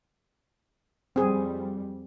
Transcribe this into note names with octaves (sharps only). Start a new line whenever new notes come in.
F2 G3 C4 G#4